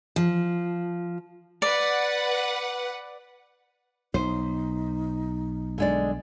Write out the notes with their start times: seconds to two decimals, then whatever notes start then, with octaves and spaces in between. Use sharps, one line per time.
0.16 F3
1.62 B4 D5 F#5
4.14 B1 D#4 C5
5.78 D3 G#3 D5